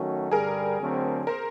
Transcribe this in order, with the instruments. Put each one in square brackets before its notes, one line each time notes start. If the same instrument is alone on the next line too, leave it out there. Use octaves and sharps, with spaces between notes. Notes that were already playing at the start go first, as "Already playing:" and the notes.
Already playing: [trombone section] D#3 F#3 A3 C#4 F#4
[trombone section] G2 D3 G3 [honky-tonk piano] G#4 A#4
[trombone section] D3 F#3 A3 C4
[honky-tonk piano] A#4 C5